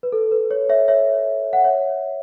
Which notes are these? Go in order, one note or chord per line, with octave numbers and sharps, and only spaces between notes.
B4
A4
B4
C#5
C#5 E5
C#5 E5
F#5
C#5 E5